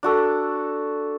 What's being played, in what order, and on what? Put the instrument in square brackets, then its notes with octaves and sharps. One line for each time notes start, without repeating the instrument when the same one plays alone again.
[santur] D4 F#4 A4